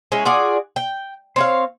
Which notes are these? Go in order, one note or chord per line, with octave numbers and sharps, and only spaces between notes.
G#3 C#4 E4
F4 F#4 G#4 D5
G5
C4 C#5 F5